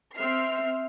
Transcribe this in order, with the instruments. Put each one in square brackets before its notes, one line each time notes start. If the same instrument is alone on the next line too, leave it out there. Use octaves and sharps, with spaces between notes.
[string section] C4 E5 F6 C7